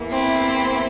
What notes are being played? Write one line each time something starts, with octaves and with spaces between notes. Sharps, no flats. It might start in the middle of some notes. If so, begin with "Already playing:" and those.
Already playing: E2 E3 A#3
C4 E4